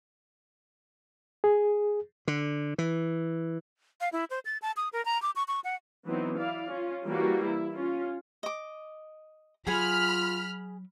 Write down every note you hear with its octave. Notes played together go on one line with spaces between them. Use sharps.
G#4
D3
E3
F5
E4
C5
A6
A5
D#6
A#4
A#5
D6
C#6
C#6
F#5
E3 F#3 B3 C4 D#4
E4 D5 F5
C#4 F4
E3 G3 A#3 F#4
E4
C#4 F4
D#5 D6
F#3 F4 G#4 F#5 G#5 B5 F6